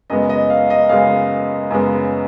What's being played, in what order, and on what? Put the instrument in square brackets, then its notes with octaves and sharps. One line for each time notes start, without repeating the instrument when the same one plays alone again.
[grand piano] F#2 C#3 G#3 B3 D#5
D#5
F5
D#5
F#2 C#3 G#3 B3 F5
F#2 C#3 G#3 B3